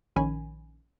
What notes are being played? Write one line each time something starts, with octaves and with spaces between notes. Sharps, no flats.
A#1 D#3 C#4 G#5 B5